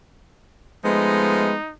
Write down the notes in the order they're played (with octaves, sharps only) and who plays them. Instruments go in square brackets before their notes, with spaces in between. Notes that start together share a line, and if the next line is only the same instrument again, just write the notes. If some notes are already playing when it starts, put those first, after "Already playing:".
[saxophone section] F3 A3 B3 [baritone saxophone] G#3 [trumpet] D#4